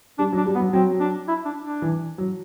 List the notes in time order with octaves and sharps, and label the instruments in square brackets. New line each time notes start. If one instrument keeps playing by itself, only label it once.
[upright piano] G3 [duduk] D4
[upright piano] F#3
[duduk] D4
[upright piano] G3
[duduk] B3
[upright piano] F#3
[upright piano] F#3 [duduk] C4
[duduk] D4
E4
D4
D4
[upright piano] E3
F#3